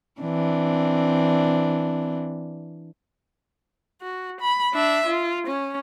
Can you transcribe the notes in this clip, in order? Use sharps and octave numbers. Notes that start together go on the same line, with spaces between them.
E3 C4 D4
F#4
B5
D4 E5
F4
C#4